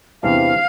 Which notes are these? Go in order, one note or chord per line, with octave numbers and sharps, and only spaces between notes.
E2 C3 E3 G3 D4 F5